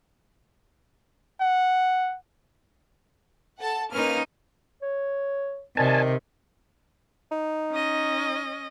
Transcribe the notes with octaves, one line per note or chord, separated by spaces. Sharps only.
F#5
A4 F#5 A5
A#3 C#4 D#4 B4 F6
C#5
C3 D#3 D5 G#5 A5
D#4
C#4 D#5